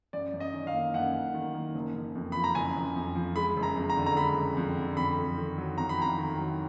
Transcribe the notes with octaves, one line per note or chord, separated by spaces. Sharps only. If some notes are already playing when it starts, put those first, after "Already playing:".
F#2 D5
F#2
D#5
D#3
F5
A#3
F#2 F#5
F#2
D#3
A#3
F#1
F#1
F2
F3 B5
A#5
F#1 G#5
F#1
F2
F3
G#3 B5
F#1
A#5
F2
A#5
D3
A#5
G#3 B5
F#1
F2
D3
F2 B5
F2
D#3
F#3
F2 A#5
B5
F2 A#5
D#3
F#3